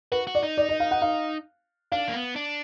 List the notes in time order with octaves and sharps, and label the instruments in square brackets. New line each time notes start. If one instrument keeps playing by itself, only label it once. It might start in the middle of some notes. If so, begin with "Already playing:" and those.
[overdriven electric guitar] F#4 [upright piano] B4
[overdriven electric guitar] F#4
[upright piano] D5
[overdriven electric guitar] D#4
[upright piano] D5
D#5
F5
F#5
F5
[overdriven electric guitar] D4 [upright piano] F5
[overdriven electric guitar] A#3
B3
D4